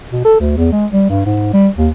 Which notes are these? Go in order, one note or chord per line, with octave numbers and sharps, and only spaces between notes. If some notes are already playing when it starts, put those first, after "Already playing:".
B2
A4
D2
E2
G#3
G3
G2
G#2
G3
D#2